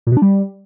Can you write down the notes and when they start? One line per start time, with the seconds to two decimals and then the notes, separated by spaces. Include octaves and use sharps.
0.07 A#2
0.12 B2
0.17 D4
0.22 G3